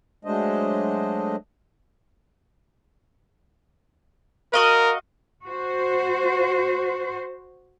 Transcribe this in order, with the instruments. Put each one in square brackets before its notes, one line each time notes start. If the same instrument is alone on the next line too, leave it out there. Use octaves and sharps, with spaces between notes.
[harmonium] F#3 G#3 A3 D4 C5 D#5
[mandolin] F#4 D#5 F5 [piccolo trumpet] A#4
[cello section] F#4 C5